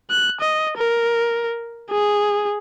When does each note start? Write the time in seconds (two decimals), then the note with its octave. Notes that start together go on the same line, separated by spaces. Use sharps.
0.11 F#6
0.40 D#5
0.77 A#4
1.91 G#4